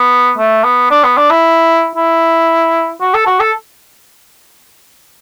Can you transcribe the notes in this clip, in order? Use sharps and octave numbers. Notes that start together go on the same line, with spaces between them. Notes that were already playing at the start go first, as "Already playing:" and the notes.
Already playing: B3
A3
B3
D4
B3
D4
E4
E4
F#4
A4
F#4
A4